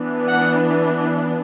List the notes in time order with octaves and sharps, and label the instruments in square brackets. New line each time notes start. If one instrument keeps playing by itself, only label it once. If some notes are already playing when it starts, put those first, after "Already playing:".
Already playing: [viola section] E3 B3 D4
F#5